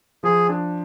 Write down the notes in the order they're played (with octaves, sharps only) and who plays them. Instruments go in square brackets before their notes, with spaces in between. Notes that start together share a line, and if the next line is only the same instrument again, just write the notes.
[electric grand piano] F3 [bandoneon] G#4
[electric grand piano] D4